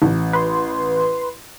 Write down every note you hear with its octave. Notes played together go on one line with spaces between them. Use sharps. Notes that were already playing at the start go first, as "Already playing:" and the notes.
A1
B4 C6